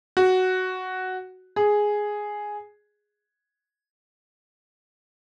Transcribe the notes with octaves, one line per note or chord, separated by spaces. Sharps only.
F#4
G#4